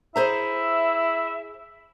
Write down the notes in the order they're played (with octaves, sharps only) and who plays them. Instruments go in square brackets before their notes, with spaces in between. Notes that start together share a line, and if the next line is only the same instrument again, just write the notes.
[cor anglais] E4 [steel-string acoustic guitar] G#4 C5 A#5 [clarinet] E5